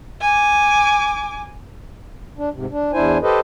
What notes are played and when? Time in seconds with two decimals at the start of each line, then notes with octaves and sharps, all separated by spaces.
0.21 G#5 D6
2.38 D4
2.53 G#2 C3
2.71 D4
2.93 E2 D4 E4 C5 G#5
3.22 G4 A4 B4 C5 D#5